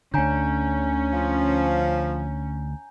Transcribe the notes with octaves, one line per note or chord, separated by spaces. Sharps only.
D2 D3 C#4 G#5 A#5 G6
F3